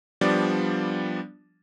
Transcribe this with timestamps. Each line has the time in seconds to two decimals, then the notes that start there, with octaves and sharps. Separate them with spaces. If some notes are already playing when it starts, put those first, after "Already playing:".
0.21 F3 G3 B3 D4 D5